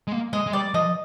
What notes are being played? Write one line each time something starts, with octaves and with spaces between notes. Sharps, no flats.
G#3
A#3
G#3 D#5
G#3
G3 D5
F3 D#5